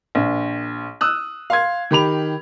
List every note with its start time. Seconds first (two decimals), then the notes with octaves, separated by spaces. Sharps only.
0.15 A#1
1.01 D#6 E6 F#6
1.50 F5 C6 G#6
1.91 D#3 G4 B5 F7